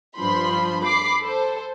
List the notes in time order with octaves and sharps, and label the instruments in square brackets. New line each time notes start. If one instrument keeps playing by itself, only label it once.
[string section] G2 F3 B5 C6
B5 D6 C7
A4 C5